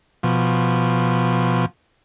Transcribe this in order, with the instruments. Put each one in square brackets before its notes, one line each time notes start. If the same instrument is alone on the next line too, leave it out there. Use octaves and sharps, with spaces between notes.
[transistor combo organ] B2 F3